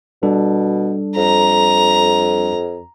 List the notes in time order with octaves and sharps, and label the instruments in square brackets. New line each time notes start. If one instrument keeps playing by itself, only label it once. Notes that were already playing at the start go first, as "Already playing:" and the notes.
[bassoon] B2 [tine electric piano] G3 D4 A4
[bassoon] F2 [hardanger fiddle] A#5